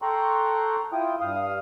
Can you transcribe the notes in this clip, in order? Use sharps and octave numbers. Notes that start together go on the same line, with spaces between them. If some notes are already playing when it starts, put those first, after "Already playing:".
A4 G5 A#5 C6 C#6 F#6
E4 F4 G5 D#6
G2 F5 D#6